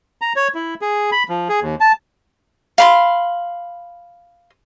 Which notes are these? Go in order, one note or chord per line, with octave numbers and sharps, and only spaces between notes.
A#5
C#5
E4
G#4
B5
F3
G#4
D#2
A5
F5 B5 C6